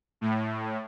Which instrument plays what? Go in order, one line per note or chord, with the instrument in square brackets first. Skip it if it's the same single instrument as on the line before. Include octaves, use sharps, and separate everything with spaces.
[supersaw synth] A2